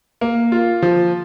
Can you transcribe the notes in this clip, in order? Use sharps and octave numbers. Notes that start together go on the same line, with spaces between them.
A#3
F4
F3